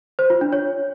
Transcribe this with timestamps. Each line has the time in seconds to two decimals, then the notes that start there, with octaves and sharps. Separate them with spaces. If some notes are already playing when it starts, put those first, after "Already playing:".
0.19 C5
0.30 F4
0.41 D4
0.53 C#5